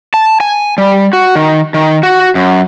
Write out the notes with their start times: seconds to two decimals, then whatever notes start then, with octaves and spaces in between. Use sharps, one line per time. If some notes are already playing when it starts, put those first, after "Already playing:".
0.14 A5
0.40 G#5
0.78 G3
1.13 F#4
1.36 D#3
1.74 D#3
2.03 F#4
2.35 F#2